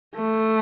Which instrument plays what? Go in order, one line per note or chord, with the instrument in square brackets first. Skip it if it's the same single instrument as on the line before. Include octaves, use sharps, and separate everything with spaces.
[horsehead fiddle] A3